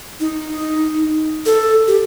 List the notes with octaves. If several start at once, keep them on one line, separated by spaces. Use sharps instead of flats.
D#4
A4
G4